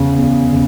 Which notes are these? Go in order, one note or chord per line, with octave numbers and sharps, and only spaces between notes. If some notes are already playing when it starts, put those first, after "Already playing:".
Already playing: E2 C#3
E2
C#3